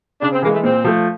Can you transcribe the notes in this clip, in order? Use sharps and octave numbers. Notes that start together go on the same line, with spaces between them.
C#3 D4
C4
E3 G#3 A#3
A3
A#2 C4
F3 A3